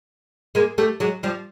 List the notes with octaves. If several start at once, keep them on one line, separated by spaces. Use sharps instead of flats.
G#3 A#3
G3 A3
F#3 G#3
F3 G3